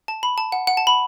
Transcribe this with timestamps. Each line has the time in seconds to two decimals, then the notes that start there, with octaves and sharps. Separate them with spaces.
0.08 A5
0.23 B5
0.38 A5
0.52 F#5
0.67 F#5
0.77 A5
0.87 B5